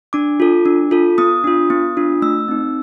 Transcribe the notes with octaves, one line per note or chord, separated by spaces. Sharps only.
D4 D6
F4 A4
D4
F4 A4
B3 D#6
D4 F4
B3
D4 F4
A3 E6
C4 D#4